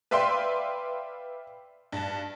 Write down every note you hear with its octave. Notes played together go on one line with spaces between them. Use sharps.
B4 D5 E5 F5 G5 C6
G2 A5